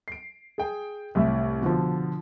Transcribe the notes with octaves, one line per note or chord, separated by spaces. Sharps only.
C7 D7
G#4 G5
C2 A2 E5
B2 D3 F3